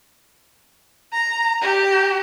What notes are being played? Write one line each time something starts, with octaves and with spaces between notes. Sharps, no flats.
A#5
G4